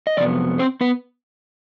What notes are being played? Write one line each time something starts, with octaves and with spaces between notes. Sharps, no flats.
D#5
F2 C3 F#3 B3 D5
C4 C5
B3 B4